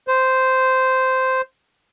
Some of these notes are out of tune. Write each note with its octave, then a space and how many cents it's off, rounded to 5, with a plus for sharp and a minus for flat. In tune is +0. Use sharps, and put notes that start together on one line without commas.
C5 -10